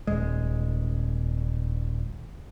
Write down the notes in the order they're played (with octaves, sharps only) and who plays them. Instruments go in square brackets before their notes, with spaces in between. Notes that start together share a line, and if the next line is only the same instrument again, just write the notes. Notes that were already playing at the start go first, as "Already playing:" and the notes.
[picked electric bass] D#1 G#3